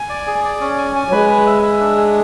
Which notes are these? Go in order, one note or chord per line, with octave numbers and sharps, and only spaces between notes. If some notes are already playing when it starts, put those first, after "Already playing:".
Already playing: G#5
D5
G#4
D5
C#4
G#5
G#5
F#3
G#3 B4
B4
E5
E5
D4
G#4